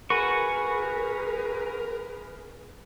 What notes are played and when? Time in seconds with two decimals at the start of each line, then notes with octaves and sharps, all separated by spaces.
0.10 F#4 G#4 A#4 B4 G#5 B5 C#6